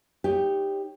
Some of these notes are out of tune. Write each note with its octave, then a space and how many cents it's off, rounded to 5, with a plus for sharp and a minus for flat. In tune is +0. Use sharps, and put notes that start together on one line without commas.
D#4 +0 G4 +10 C#5 -5